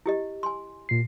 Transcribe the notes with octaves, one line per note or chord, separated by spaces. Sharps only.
E4 G4 D#5
G#5 C6
A#2 C7